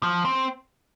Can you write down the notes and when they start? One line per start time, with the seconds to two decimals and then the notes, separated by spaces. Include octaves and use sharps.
0.03 F3
0.25 C4